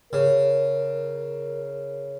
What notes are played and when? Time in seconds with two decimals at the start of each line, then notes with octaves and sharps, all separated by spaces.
0.13 C#3 A#4